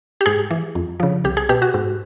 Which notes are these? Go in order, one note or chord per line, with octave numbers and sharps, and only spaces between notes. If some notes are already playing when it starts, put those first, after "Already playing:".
G4
G#2 G#4
E3
F2
C#3 F3
C2 G4
G#4
B2 G4
F#4
G#2